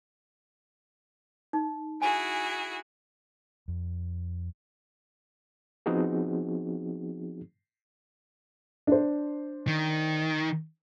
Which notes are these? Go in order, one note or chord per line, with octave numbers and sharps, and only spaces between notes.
D#4
E4 F#4 G#4 G#5
F2
F3 B3 C4 D#4 F#4 G#4
D4 C5
D#3